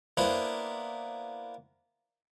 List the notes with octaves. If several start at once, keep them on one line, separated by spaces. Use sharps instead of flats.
A#3 B3 D4 E4 C5